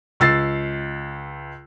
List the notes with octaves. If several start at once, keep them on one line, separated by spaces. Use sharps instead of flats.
C#2 E6 A6 C7